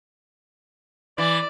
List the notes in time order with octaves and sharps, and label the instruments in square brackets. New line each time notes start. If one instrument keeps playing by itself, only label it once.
[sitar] E3 [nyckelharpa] D5